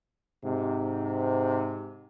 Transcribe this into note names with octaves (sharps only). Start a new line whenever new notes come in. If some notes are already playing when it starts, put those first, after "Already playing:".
G#2 C3